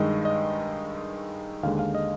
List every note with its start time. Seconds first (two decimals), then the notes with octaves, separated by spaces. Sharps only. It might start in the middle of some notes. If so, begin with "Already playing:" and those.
Already playing: G2 D#3 G#3 D#5
0.25 D#5
1.63 D#2 D3 G#3 F5
1.79 F5
1.95 D#5